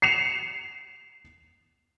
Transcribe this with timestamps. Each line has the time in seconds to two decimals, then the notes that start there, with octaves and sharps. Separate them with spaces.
0.02 C7 C#7 E7 F7